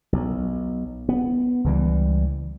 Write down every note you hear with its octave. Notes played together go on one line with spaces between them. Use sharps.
B1
B3
C#2 E3 G3